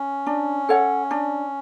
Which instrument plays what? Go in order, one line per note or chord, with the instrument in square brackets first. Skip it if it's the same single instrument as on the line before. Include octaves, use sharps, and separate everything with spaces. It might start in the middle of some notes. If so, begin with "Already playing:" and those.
Already playing: [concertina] C#4
[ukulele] D4
A4 C#5 F#5
D4